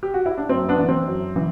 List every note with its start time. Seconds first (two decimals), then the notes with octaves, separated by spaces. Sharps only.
0.03 G4
0.14 F#4
0.26 E4
0.38 D4
0.49 F#2 C4
0.68 B3 D4
0.78 E3
0.89 C4
1.08 F#2
1.36 E3